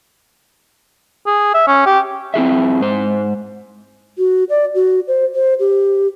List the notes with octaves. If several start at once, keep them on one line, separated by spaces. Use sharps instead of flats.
G#4
E5
C#4
G4
C4 E4 G#4 E5
G#2 C5
F#4
D5
F#4
C5
C5
G4